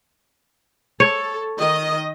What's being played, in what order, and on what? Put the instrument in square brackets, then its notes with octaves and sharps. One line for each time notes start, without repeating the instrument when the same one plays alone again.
[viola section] A4 [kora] C#5
[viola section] D#3 D#5